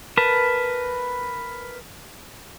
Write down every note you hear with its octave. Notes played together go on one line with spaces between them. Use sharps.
A#4 B4 A5